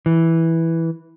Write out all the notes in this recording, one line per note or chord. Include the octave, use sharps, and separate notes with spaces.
E3